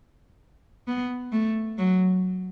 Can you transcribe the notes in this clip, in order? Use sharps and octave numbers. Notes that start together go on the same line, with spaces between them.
B3
A3
F#3